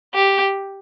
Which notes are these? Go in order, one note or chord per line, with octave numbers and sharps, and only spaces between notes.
G4